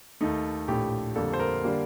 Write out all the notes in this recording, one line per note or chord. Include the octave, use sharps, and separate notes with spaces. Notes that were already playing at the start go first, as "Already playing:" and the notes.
D#2 D#3 A3 D#4
A#1 A2 A3 G4
F2 D3 G3 A#3 A4
C5
A#4
D3 G3 A#3